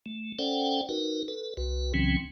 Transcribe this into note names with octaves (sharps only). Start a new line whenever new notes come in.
A3
C#4 A4 C5 D5 F#5 G5
D#4 F#4 A#4 B4
A4 B4
C2 F#4 B4
C2 C#3 E3 F#3 C4 C#4